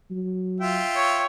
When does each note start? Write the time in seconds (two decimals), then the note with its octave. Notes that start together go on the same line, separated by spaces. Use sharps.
0.11 F#3
0.61 F4 E5 G5
0.96 C#5